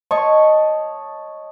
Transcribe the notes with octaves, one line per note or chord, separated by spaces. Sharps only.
C#5 D#5 A5 C#6